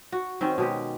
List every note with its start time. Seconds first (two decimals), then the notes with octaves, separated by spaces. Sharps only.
0.12 F#4
0.41 D#3 C4 C#4
0.58 B2 G#3 G4